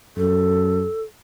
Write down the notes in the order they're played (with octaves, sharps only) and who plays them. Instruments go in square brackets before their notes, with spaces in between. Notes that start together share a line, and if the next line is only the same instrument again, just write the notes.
[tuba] F#2 [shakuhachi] A4